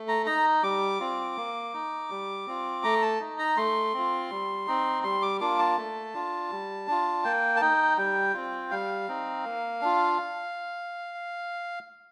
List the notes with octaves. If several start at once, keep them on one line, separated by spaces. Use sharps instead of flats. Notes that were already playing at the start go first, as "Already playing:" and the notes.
Already playing: A3
A#5
D#4 A#5
G3 D6
C4 F4
A#3
D#4
G3
C4 F4
A3 A#5
A5
D#4
A#5
A3 C6
C4 F4
G3
C4 D#4
G3 C6
D6
A#3 D4 F4 D6
A5
A3
D4 F4
G3
D4 F4
A#3 G5
A5
D#4 G5
G3 G5
C4 F4
G3 F5
C4 D#4
A#3
D4 F4